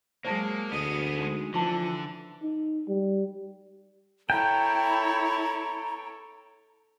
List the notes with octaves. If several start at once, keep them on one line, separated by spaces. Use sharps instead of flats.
F#3 G#3 A#3 C5 G5 A5
D2 B3 G#4 D#5
G#3 D#4 F#5 C6
D3 E3 F3 C#4 A5 C6
D#4
G3
E4 A4 C#5 G5 A#5